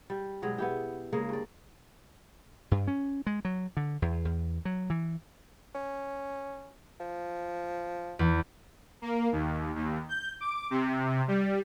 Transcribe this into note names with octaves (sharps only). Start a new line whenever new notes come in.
G3
B2 F#3 G#3
B3 E4 G4
C#3 G#3 A#3
G2 D5
G2
C#4
G#3
F#3
D3
E2
E2
F#3
E3
C#4
F3
E2
A#3
D#2
D#2
G6
D6
C3
G3